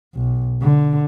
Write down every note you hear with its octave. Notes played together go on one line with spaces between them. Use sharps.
B1
D3